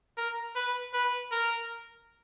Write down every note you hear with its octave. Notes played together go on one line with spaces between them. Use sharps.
A#4
B4
B4
A#4